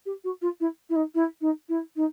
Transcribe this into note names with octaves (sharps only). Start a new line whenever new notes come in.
G4
F#4
F4
E4
E4
D#4
E4
D#4
E4
D#4